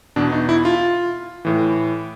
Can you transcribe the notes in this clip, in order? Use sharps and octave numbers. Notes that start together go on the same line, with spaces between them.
E2 B2 D4
D#4
E4
F4
A2 E3